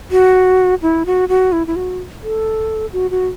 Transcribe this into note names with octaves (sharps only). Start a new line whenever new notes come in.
F#4
E4
F#4
F#4
E4
E4
F#4
A4
F#4
F#4